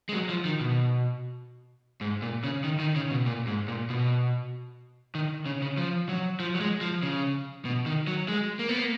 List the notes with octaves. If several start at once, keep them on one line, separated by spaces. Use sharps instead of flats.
G#3
F#3
F3
D#3
B2
G#2
A#2
C#3
D#3
D#3
C#3
B2
A#2
G#2
A#2
B2
D#3
C#3
C#3
F3
F#3
F3
F#3
G#3
F3
C#3
B2
D#3
F#3
G#3
A#3
B3
A#3